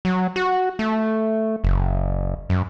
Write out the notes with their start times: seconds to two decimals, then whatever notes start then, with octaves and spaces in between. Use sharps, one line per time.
0.05 F#3
0.36 F#4
0.79 A3
1.64 F#1
2.50 F#2